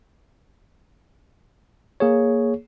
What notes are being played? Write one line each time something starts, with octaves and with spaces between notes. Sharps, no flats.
A#3 G#4 C#5